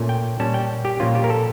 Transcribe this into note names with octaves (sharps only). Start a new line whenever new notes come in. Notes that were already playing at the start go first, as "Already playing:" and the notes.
Already playing: A#2 A3 C#4
G5
A#2 G3 C#4 A5
G5
G4
A#2 F3 A#3 C#4 F4
G4
A#4
A4